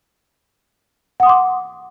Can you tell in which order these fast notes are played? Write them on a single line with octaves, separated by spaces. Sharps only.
F#5 D#6 C6 D6